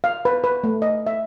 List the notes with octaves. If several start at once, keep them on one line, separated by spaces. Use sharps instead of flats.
F5
B4
B4
A3
D#5
E5